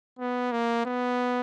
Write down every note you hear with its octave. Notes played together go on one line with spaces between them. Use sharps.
B3
A#3
B3